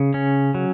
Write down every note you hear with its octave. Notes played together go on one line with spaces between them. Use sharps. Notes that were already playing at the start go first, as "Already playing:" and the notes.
Already playing: C#3
C#4
F#3